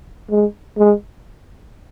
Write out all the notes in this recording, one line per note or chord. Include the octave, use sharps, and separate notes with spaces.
G#3
G#3